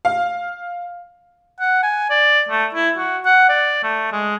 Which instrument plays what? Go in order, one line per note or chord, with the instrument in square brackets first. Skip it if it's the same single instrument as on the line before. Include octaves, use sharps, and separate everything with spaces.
[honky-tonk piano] F5
[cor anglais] F#5
G#5
D5
A3
E4
F#4
F#5
D5
A3
G#3